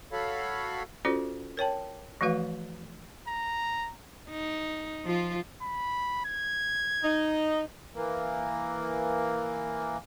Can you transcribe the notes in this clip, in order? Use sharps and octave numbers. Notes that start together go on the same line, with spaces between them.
F#4 A4 C#5 F5 B5
C#4 F4 F#4 A4 C5 D5
A#4 C#5 G5 A5
E3 F3 A3 F#4 B4 F5
A#5
D#4
F3 F4
B5
G#6
D#4
E3 A#3